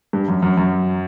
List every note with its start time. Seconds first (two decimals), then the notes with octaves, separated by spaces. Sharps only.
0.13 G2
0.28 F#2
0.42 F#2
0.57 F#2